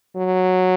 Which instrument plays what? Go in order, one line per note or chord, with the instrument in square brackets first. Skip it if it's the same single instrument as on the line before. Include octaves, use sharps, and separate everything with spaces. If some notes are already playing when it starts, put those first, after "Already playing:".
[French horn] F#3